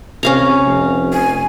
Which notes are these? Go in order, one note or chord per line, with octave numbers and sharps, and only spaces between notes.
C3 C#4 F5 A#5
F1
G#5